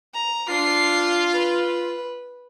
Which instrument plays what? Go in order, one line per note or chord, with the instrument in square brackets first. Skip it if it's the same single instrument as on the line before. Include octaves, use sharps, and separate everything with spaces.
[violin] A#5
[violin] D4 C7 [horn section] F4
[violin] B4